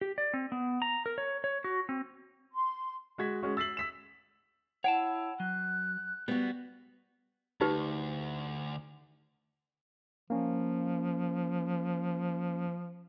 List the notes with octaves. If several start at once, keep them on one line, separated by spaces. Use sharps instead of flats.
G4
D5
C4
B3
A#5
A#4
C#5
C#5
F#4
C4
C6
G#3 F#4 G#6 B6
G#3 C#4 F#4
E6 A6 B6 C7 F#7
E6 B6 E7
E4 C#5 F#5 G5 A5
F#3 F#6
G3 B3 F#4
D2 D#4 G4 B4
F3 A#3 C#4